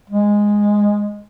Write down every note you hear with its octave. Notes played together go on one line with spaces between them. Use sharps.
G#3